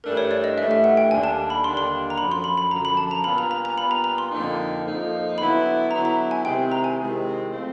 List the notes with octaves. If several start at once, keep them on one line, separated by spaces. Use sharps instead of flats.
G2 E3 A3 D4 A#4
C#5
D5
D#5
G2 E3 A3 D4 E5
E5
F#5
G5
D#2 D3 G3 A#3 D4 G#5
A5
B5
D#2 D3 G3 A#3 D4 C6
C6
A#5
F#2 D3 F3 B5
C6
B5
B5
F#2 D3 F3 A#5
B5
A5
A#5
A#2 G3 B3 D4 F4 B5
A#5
A#5
A#5
A#2 G3 B3 D4 F4 B5
A#5
A#5
C6
F2 D3 F3 A#3 D#4
F2 D3 F3 A#3 D#4
D3 F#3 B3 E4 B5
D3 F#3 B3 E4 A#5
A#5
G#5
C3 D#3 G#3 C4 E4 G5
A#5
G#5
C3 D#3 G#3 C4 E4
F3 A3 C4